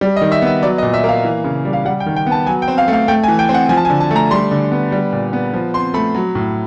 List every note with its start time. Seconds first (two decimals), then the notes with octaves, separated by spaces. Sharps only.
0.01 G3
0.17 D#5
0.21 D#3
0.32 E5
0.42 B3 E5
0.62 F#3 D5
0.78 D#5
0.83 A#2
0.94 E5
1.04 A#3
1.09 F5
1.24 E3
1.44 C#3
1.65 G3
1.73 F5
1.85 G3 F#5
2.00 G5
2.06 D#3
2.16 G5
2.27 B3
2.32 A5
2.47 F#3 G#5
2.62 G5
2.68 C4
2.78 F5
2.88 A3
2.93 F5
3.08 A3 G5
3.24 G#5
3.28 E3
3.39 G5
3.49 C4
3.54 F#5
3.69 F3 G#5
3.77 A5
3.85 G#5
3.90 D3
4.00 A5
4.11 A3 A#5
4.31 G3 C6
4.51 D3
4.72 B3
4.92 G3
5.12 A#2
5.33 B3
5.53 F3
5.74 C4 C6
5.94 A3 B5
6.15 F#3
6.35 A2